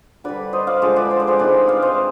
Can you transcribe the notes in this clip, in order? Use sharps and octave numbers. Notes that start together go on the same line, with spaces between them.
D3 G3 B4 D5
C5 D#5
D5 F5
D3 F3 G#3 C5 D#5
B4 D5
C5
D5
G#4 C5
C3 D#3 G#3 B4 D5
D5 F5
C5 D#5